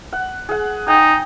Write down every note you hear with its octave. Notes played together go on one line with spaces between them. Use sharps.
F#5
G#4 F#5
D#4 G5 G#5